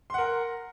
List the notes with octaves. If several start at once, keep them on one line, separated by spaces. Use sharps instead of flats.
A#4 F#5 C6